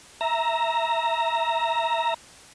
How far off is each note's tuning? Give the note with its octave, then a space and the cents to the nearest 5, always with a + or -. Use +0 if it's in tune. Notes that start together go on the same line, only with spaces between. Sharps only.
E5 +0 A#5 +0